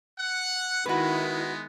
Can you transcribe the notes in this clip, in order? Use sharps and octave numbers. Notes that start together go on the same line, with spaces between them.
F#5
D#3 G#3 B3 E4 F#4 B4